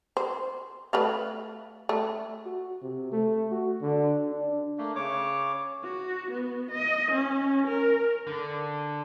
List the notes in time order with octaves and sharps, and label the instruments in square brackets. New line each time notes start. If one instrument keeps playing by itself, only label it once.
[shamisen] C5
A3 B4 F5
A3
[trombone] F#4
C3
A3
F#4
D3
D4
[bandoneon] A3 A#3
C#3 C#5 D6
[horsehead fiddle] F#4
B3
D#5
C#4
A#4
[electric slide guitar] D3